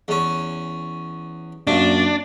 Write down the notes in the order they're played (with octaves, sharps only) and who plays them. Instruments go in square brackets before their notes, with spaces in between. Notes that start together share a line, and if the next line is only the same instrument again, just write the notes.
[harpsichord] E2 C#4
[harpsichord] F#2 A#2 [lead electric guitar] D4